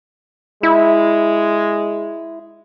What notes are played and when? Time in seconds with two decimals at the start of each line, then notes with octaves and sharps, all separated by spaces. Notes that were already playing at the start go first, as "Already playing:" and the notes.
0.63 G#3 E4